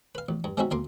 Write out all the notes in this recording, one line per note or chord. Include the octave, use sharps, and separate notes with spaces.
B4 F5
A1
G2
G#3 C4 C#4 D#4 F#4 E5
D2 A#3 C6 D6